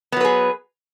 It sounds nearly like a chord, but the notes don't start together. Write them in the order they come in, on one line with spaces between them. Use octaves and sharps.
B3 F#3 B4 G#4